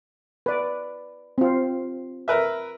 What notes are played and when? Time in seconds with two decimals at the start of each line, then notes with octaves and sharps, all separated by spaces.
0.46 B4 D5
1.38 C4 F4
2.28 A#4 B4 E5